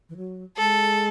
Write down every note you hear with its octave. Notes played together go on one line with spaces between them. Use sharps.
E3
F#3
G#3 A4